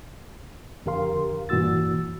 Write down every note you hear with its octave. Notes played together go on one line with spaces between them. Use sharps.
F2 D3 G4 A#4 F5 C6
G2 A#2 E3 F#4 E6 A6